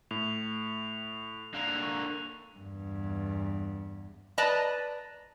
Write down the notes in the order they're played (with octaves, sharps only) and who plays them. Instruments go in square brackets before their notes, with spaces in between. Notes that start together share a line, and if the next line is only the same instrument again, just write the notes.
[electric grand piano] A2 [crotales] F7
[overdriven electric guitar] D3 A#3 [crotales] F#6 F7
[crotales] C#6
[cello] E2 G2
[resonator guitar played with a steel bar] B4 D5 D#5 A5 A#5